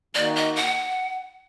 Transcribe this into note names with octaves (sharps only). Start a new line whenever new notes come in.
D#3 A#3 D#4 F#4 D5
D#5
F#5